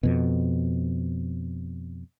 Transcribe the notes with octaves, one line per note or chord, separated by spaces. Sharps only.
F2 B2